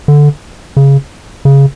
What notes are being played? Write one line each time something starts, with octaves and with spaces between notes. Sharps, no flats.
D3
C#3
C#3